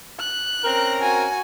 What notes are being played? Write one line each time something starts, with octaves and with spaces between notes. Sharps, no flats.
F#6
C4 C#4 A#4
F#4 G#5